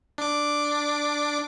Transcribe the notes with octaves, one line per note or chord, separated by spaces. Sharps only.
D4 D6